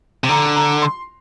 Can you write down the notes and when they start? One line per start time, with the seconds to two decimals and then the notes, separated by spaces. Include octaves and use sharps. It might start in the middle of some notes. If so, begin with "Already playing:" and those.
0.24 C3
0.29 D3 A#5
0.56 A#5
0.82 C6